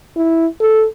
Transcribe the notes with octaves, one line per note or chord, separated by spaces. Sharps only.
E4
A4